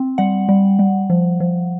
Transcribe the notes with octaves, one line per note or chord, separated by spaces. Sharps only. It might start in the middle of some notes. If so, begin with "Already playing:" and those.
Already playing: C4
G3 F#5
G3
G3
F3
F3